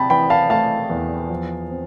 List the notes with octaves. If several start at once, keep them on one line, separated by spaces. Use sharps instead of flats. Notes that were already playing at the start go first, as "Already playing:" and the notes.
Already playing: C3 G5 A5 B5
E3 G5 B5
F5 A5
A3 F5 A5
E2
F3
C4